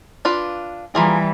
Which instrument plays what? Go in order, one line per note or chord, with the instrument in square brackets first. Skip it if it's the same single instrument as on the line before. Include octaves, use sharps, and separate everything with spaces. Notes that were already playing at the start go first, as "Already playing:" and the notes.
[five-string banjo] D4 F4 B4
[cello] E3 G3 [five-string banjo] A#3 F4 G#4